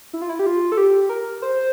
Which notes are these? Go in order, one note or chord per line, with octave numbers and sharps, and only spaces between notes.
E4
F4
E4
G4
F4
A4
G4
A#4
C5